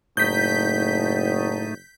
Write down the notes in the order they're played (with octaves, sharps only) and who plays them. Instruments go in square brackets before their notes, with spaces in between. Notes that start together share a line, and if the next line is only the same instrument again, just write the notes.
[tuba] F#1 [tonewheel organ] A2 A3 D#4 [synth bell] G6 B6